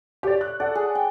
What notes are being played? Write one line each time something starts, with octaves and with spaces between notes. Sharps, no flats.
G4 C#5 D5
F#6
A4 D5 F#5
G#4
G5